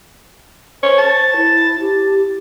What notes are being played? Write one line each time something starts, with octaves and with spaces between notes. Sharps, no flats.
C5 C#5
A5
E4
G4